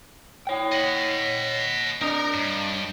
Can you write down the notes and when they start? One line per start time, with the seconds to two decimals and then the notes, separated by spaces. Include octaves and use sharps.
0.47 C#5 G5
0.72 D#5 F#5
2.01 D4 A#4 D#5 A#5
2.34 G2